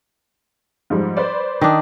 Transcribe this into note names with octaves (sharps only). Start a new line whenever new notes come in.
G#2 F3 G3
B4 C5 D5
D#3 D4 D#6